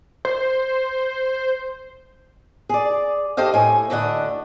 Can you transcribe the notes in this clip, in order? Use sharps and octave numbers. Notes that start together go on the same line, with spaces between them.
C5
G#4 D5
G4 A4 C5 D#5 F5
A2 G#5
D2 A2 D3 D4 D#5 F#5